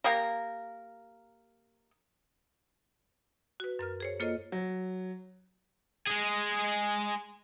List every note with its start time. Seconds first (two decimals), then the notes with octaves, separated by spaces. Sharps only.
0.04 A#3 G4 A#4
3.60 F#4 B4
3.79 F#2 A#4 F6
4.00 G#4 C5 C#5
4.20 A#3 F4 A4 C5 C#5 D#5
4.52 F#3
6.07 G#3 G#4